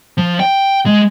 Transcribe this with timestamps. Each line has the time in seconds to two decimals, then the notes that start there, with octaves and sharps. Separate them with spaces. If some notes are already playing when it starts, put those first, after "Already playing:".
0.18 F3
0.40 G5
0.86 G#3